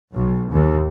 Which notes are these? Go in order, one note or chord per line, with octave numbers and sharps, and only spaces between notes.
B1
D#2